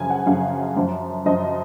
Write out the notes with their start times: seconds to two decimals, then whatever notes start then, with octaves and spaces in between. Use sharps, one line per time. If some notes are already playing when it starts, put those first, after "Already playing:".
Already playing: F#2 C#3 F3 G#5
0.10 F#5
0.26 F#2 C#3 F3 F5
0.76 F#2 F3
1.26 F#2 F3 D#5